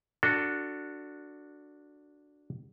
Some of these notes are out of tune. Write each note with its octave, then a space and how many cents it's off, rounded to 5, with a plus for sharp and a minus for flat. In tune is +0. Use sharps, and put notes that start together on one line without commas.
D4 +0 F#4 -10 A4 +20